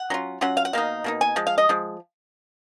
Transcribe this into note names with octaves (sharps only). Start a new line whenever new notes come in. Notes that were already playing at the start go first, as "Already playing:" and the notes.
Already playing: F#5
F#3 C#4 F4
F#3 C#4 F4 F#5
F5
F#5
B2 A#3 D#4 F5
B2 A#3 D#4
G#5
F3 G#3
F5
D#5
F3 G#3